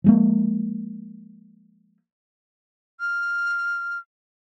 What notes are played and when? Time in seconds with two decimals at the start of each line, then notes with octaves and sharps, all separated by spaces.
0.04 F3 G#3 A#3
3.00 F6